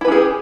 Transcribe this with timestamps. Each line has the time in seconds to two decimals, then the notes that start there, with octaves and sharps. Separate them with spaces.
0.01 E4
0.05 B4
0.08 C#4
0.12 G#4
0.15 G4